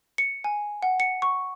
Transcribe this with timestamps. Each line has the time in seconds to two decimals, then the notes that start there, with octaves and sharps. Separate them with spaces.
0.18 C#7
0.44 G#5
0.83 F#5
1.00 C#7
1.22 C#6